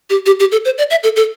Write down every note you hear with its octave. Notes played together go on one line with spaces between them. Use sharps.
G4
G4
G4
A4
C5
D5
E5
A4
A4